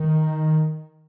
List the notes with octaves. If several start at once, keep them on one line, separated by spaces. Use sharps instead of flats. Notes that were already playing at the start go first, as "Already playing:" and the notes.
Already playing: D#3